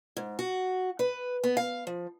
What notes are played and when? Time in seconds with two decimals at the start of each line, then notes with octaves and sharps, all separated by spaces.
0.17 G#2
0.39 F#4
0.99 B4
1.44 B3
1.57 F5
1.87 F3